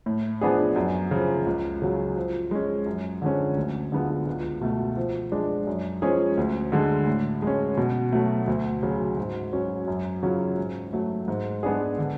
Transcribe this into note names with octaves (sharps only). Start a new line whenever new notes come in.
A2
F3 B3 D4 G#4
F#2
C#3 F3
C#2
C#3 F#3
F3
G#3 C#4
F#2
D3 F3 G#3 C#4
D2
D3 G#3 B3 F4
C#2
B2 A3
F3
G#3 D4
F#2
F3 G#3 C#4 G#4
D2
D3 G#3
A2
G#3 C#4
B2
F#3 A3
D2
C#3 F#3
G#2
F#3 C#4
F#2
C#3 F#3 C#4 F4
G#2
F#3 A3
G#2
G#3 B3 D4 G#4
D3